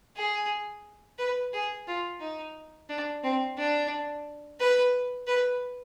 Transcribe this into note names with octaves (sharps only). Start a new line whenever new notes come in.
G#4
B4
G#4
F4
D#4
D4
C4
D4
B4
B4